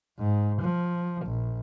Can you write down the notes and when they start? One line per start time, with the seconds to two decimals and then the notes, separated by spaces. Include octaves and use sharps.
0.19 G#2
0.62 F3
1.26 A#1